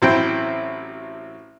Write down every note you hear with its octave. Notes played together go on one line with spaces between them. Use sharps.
A1 F#3 C4 E4 C5 G5